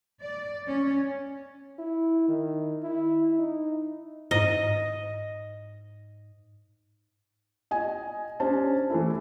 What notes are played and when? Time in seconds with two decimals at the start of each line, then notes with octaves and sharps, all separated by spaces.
0.24 D5
0.66 C#4
1.78 E4
2.28 D#3
2.83 E4
3.38 D#4
4.31 G#2 D#5
7.71 D#5 G#5
8.40 C#4 D4 G4 C5 A5
8.90 E3 A3 E4